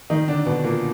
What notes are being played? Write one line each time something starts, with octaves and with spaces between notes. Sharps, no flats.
D#3 D#4
D3 D4
B2 B3
A#2 A#3